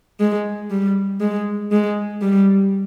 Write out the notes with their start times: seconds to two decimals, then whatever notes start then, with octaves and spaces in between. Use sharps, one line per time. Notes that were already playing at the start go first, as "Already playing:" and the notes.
0.20 G#3
0.70 G3
1.20 G#3
1.72 G#3
2.22 G3